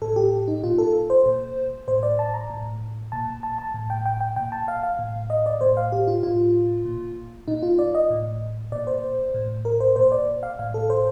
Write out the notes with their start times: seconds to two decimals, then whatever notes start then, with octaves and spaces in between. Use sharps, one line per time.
0.01 A2 A4
0.16 G4
0.48 D#4
0.64 A#2 F4
0.78 A4
1.10 C5
1.26 A#2
1.88 A2 C5
2.03 D5
2.19 A5
2.34 A#5
2.50 A2
3.12 A#2 A5
3.43 A5
3.59 A5
3.74 A2
3.90 G5
4.06 G5
4.21 G5
4.36 A#2 G5
4.52 A5
4.68 F5
4.83 F5
4.99 A2
5.30 D#5
5.46 D5
5.61 A2 C5
5.77 F5
5.92 G4
6.08 F4
6.23 A2 F4
6.85 A#2
7.48 A#2 D#4
7.63 F4
7.79 D5
7.95 D#5
8.10 A2
8.72 A#2 D5
8.87 C5
9.34 A2
9.65 A#4
9.80 C5
9.96 A#2 C5
10.12 D5
10.43 F5
10.59 A2 F5
10.74 A4
10.90 C5